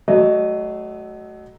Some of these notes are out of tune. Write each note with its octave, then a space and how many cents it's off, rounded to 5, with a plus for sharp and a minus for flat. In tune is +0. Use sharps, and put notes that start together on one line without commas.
F#3 +20 A3 -20 D#5 -20